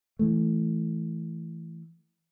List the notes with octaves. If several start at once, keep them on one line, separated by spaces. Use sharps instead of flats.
E3 A3